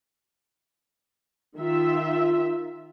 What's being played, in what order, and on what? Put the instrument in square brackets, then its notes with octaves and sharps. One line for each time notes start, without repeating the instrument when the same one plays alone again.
[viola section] D#3 F4 E5